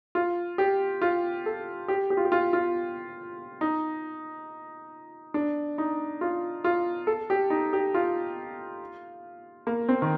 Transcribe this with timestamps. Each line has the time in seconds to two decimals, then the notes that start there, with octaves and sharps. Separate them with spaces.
0.15 F4
0.58 G4
1.02 F4
1.46 A4
1.88 G4
2.10 G4
2.17 F4
2.25 G4
2.32 F4
2.53 F4
3.61 D#4
5.34 D4
5.78 D#4
6.21 F4
6.64 F4
7.07 A4
7.30 G4
7.50 D#4
7.73 G4
7.94 F4
9.67 A#3
9.89 C4
10.02 D#3